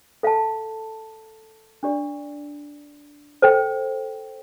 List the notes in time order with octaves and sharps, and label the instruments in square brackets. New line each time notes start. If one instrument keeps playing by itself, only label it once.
[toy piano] A4 F5 A5
D4 G4 D5
A4 C5 G5